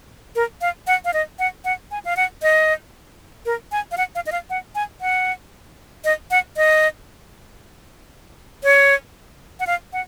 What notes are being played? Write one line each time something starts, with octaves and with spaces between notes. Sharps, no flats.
A#4
F5
F#5
F5
D#5
F#5
F#5
G#5
F5
F#5
D#5
A#4
G#5
F5
F#5
F5
D#5
F5
F#5
G#5
F#5
D#5
F#5
D#5
C#5
F#5
F5
F#5